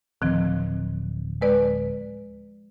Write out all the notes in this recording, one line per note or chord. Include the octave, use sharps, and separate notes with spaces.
D1 D#3 F3 C4
G#3 B4 D5